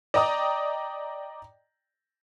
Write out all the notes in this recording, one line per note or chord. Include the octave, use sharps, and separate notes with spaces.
D5 D#5 G5 A#5 D6 D#6